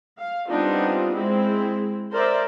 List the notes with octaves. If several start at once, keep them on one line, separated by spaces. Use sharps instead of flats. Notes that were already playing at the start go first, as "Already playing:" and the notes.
F5
G3 B3 C4 D4 D#4 F4
G#3 C4 E4
A#4 C5 D5 E5